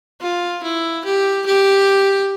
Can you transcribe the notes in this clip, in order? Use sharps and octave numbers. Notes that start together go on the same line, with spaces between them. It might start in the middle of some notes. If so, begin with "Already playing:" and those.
F4
E4
G4
G4